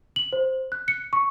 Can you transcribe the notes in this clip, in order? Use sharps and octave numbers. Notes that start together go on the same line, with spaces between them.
F#7
C5
F#6
C#7
C#6